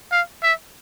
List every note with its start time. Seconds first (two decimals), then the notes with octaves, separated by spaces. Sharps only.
0.12 F5
0.43 E5